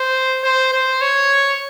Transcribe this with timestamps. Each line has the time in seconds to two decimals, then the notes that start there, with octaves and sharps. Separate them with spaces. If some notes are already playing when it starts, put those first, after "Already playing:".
Already playing: C5
0.43 C5
0.73 C5
1.01 C#5